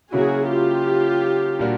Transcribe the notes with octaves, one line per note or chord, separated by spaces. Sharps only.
C#3 F#3 A#3 C#4 E4 F#4 G#4
F4 G4
A#2 G3 A#3 D4 F#4